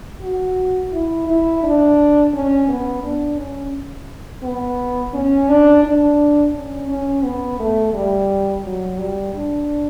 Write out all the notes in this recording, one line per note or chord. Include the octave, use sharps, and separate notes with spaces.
F#4
E4
E4
D4
C#4
B3
D4
C#4
B3
C#4
D4
D4
C#4
C#4
B3
A3
G3
F#3
G3
D4